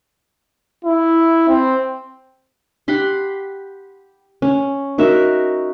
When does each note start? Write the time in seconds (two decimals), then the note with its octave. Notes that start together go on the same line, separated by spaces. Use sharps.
0.85 E4
1.48 C4
2.88 G4 F#5 B5 C6
4.42 C#4
4.98 D#4 F#4 A#4 E5